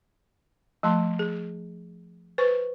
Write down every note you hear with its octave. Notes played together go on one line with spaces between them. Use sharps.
F3 A3 A5 C6
G#4
B4 C5 C#6